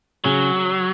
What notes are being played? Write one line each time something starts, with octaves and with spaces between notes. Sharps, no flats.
C#3 F#3